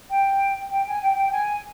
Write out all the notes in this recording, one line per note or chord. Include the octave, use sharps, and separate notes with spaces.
G5
G5
G#5
G5
G5
G#5